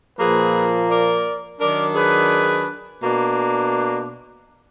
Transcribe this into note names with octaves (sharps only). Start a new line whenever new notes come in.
A#2 F3 A#3 G#4 B4
A#4 D5
D#3 F#3 D4 A#4 D5
G#4 B4
B2 A#3 D4